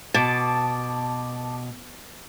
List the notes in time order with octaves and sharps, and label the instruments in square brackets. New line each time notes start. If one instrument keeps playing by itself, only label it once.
[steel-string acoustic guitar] B2 [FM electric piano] A5 D6